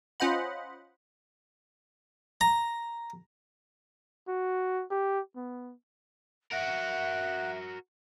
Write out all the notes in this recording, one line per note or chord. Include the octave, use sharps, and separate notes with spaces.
C#4 F4 C5 D#5 F#5 B5
A#5
F#4
G4
B3
F#4 A#4 E5 F#5